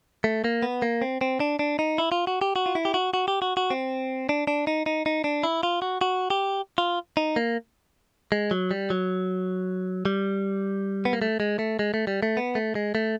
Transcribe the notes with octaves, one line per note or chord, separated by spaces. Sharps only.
A3
A#3
B3
A#3
C4
C4
D4
D4
D#4
E4
F4
F#4
G4
F#4
F4
E4
G4
F#4
F#4
G4
F#4
F#4
C4
D4
D4
D#4
D#4
D#4
D4
E4
F4
F#4
F#4
G4
F4
D#4
A#3
G#3
F#3
G3
F#3
G3
B3
A#3
A3
G#3
A3
G#3
A3
G3
A3
B3
A3
G#3
A3